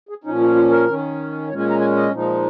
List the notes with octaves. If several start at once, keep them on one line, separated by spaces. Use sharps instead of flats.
G#4
A#2 F3 C#4 D#4
F4
F4
A#4
D#3 C#4
A#2 G#3 C#4 C#5
G#5
A#5
G#5
D#5
A#2 F3 G#3 D#4